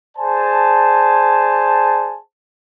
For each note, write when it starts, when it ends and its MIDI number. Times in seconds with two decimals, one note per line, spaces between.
0.18 2.18 68
0.18 2.18 72
0.18 2.18 74
0.18 2.18 80
0.18 2.18 81